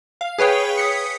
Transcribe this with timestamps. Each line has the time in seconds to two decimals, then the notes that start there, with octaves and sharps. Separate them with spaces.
0.21 F5
0.38 G#4 B4 C#5 G5
0.78 D#6 B6 C#7